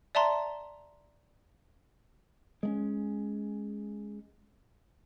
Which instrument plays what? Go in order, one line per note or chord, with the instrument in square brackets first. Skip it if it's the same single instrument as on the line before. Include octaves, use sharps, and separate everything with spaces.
[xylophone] D5 E5 A5 A#5 C6
[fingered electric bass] G#3 A3 C#4